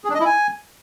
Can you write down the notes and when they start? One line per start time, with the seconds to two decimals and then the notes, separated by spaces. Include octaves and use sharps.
0.04 G#4
0.10 D4
0.15 D#5
0.20 E4
0.25 G#5